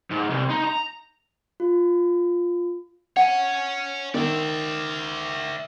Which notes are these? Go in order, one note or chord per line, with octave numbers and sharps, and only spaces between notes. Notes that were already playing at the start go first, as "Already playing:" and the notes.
G#2
C2
D#4
A#5
F4
C#5 F#5 G#5
D#3 D5 E5